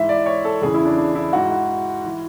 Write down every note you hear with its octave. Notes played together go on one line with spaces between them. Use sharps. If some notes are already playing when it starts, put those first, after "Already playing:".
Already playing: G#2 E3 E5
D5
C#5
A4
E2 C#3 E3 G#4
E4
D4
D4
E4
G#2 E3 F#4
E3